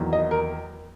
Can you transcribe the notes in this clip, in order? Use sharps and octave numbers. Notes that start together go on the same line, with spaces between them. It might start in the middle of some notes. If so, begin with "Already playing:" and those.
Already playing: E2 D#3 F#3 A#3
D#5
A#4